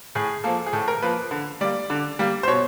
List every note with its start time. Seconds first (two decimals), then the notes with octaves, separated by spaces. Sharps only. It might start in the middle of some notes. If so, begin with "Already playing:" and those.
0.15 A2 G#4
0.44 F3 A#3 A4
0.66 G#4
0.73 A2 A4
0.88 A#4
1.02 F3 A#3 B4
1.31 D3
1.61 G3 A#3 D5
1.90 D3
2.19 G3 A#3
2.43 C5
2.48 B2 C#5